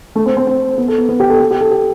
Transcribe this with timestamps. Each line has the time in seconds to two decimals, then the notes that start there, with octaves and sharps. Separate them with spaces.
0.16 A3
0.26 C4
0.37 C4
0.47 C4
0.78 B3
0.88 A4
0.98 B3
1.09 B3
1.20 G4
1.30 A4
1.40 A4
1.51 G4
1.61 A4
1.71 G4